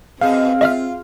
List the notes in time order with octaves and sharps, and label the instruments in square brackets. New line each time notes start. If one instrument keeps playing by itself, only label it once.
[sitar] B2 G#4 [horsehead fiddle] C4 [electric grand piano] F5
[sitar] F4 [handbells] D#5 E5 F6